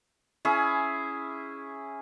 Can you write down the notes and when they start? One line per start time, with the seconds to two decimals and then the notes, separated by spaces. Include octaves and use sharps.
0.45 C#4 E4 G#4